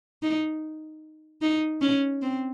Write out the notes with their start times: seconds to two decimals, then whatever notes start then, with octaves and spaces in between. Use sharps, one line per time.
0.22 D#4
1.42 D#4
1.81 C#4
2.22 C4